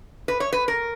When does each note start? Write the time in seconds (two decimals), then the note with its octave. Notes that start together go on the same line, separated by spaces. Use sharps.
0.28 B4
0.40 C#5
0.53 B4
0.68 A#4